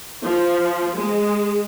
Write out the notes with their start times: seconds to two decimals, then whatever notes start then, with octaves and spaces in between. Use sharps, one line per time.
0.22 F3
0.96 G#3